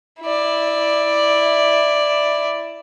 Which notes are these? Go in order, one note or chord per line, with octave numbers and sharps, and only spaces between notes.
E4 D5